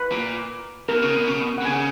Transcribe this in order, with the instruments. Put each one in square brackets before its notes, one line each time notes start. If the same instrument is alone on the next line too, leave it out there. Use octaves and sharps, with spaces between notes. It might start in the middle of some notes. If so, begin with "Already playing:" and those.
Already playing: [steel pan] B4
[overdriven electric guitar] A#2
[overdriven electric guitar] B2 [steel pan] A#4
[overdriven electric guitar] C#3
B2
C#3
B2
[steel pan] F#5
[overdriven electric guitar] B2
[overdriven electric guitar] C#3 [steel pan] G#5